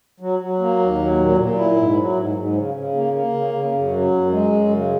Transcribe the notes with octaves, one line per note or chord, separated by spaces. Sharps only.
F#3
F#3
A#3
D#2
F#3
A#2
A#2
E4
G#2
F#3
G#2
G#2
C#3
C#3
A#3
A#3
C#3
C#3
F#2
F#3
F#2
G#3
F#2
C#3